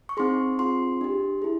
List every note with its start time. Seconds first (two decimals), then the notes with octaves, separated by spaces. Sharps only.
0.09 C#6
0.17 C4 D#4 G#4 C6
0.58 C4 F4 G#4 C6
1.01 D4 G4
1.42 E4 G#4